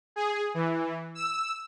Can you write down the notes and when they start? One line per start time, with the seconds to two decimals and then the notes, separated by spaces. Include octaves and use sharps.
0.16 G#4
0.54 E3
1.15 E6